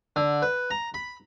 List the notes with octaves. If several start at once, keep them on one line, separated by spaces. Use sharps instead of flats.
D3
B4
A#5
B5